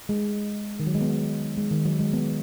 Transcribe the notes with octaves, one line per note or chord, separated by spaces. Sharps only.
G#3
D#3
F#3
G#3
B3
G#3
D#3
F#3
G#3
B3